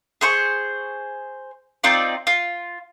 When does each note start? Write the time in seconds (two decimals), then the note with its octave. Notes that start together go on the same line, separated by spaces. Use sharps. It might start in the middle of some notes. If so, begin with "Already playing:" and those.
0.21 G#4 C5 C#6
1.84 C4 D#4 F4 D5
2.27 F4